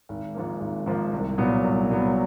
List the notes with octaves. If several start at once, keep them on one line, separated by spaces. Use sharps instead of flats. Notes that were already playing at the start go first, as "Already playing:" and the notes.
G#1
G#2 F3 A#3
G#1
G#2 F3 A#3
C2
A#2 F#3 B3
C2
A#2 F#3 B3